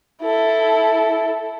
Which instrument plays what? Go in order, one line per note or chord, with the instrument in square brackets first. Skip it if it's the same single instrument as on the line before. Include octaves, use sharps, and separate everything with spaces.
[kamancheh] E4 A4